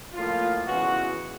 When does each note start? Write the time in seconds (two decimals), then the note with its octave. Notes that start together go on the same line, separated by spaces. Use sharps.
0.14 A2 F3 A#3 F4
0.66 E2 C#3 E3 G#3 F#4